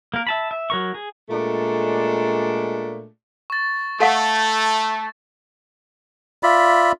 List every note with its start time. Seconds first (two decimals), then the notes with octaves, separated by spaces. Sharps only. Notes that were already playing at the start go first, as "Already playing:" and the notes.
0.14 A#3 A#4
0.27 E5 A5 B5
0.51 E5
0.70 F#3 A#4 C#6
0.94 G#4
1.29 A#2 G#3 A3 D4
3.50 C#6 A6
4.00 A3 A4 F5 F#5 A5
6.43 F4 D5 E5 B5